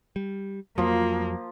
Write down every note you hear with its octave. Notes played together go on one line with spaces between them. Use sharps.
G3
F2 F3 F#3 A#3